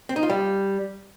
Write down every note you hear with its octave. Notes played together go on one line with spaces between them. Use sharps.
C4
D#4
F4
G3